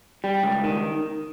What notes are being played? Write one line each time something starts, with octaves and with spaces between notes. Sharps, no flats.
G3
C#2
D#3